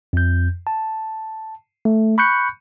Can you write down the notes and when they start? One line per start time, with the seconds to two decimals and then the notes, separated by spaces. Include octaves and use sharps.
0.13 F2 G6
0.67 A5
1.85 A3
2.18 B5 C#6 F#6 G6 C#7